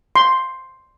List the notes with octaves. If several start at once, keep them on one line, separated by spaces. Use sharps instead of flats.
C6